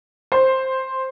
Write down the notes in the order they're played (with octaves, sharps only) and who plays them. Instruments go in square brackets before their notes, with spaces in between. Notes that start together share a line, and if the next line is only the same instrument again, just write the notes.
[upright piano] C5